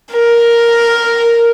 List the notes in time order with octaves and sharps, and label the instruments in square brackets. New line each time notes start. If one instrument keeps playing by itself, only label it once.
[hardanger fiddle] A#4